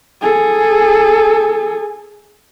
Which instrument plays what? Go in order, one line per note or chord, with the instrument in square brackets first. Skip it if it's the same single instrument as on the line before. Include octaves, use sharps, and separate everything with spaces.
[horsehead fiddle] G#4 A4